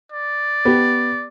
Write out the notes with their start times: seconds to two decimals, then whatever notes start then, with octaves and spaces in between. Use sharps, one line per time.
0.12 D5
0.65 B3 G4